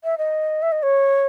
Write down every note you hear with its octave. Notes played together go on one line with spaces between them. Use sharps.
E5
D#5
E5
D#5
C#5